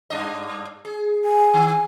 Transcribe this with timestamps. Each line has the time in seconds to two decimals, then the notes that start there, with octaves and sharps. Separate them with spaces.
0.10 G2 D4 D#5
0.85 G#4
1.25 G#5
1.54 D#3